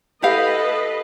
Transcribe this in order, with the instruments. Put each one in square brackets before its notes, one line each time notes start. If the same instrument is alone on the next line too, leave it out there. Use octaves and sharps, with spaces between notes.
[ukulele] E4 G4 F5 [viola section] A4 B4 D#5